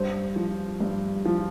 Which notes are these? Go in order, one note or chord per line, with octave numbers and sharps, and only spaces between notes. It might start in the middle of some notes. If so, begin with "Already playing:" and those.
Already playing: G2 C5
F3
G2
F3